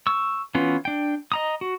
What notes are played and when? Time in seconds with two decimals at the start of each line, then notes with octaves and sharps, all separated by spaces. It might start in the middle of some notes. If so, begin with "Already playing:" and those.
0.07 C#6 E6
0.55 E3 B3 C#4 F4
0.85 D4 G5
1.32 D#5 A#5 D#6
1.61 F#4